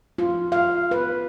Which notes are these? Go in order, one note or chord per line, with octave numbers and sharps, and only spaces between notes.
F4
F5
B4